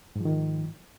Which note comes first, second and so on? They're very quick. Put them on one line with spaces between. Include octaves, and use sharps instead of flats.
G#2 F3 D#3